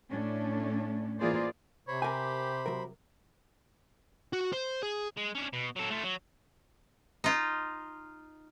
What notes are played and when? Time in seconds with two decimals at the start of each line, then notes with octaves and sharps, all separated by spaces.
0.11 A2 A3 C#4 D4
1.19 E3 A#3 F4 G#4 C5 D5
1.88 C3 C5 C#5 B5
2.02 G4 A#4 G#5
2.66 F#3 A#4
4.33 F#4
4.53 C5
4.83 G#4
5.17 G#3
5.35 C#4 D4
5.53 B2
5.76 F#3 A4
5.91 A3 F4
6.04 F#3
7.24 D#4 F4